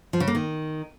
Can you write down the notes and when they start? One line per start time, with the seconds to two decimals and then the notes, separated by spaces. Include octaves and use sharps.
0.13 F3
0.20 C#3
0.28 A#3
0.35 D#3